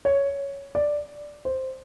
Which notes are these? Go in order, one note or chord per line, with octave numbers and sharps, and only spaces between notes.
C#5
D5
C5